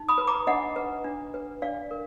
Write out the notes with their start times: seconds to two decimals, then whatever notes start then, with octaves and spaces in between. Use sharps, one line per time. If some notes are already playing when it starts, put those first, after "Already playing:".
Already playing: D#4
0.09 B5 D#6
0.18 B4
0.27 A#5 D6
0.47 D4 D#5 F#5
0.76 B4
1.04 D4
1.34 B4
1.62 D4 D5 F5
1.91 A#4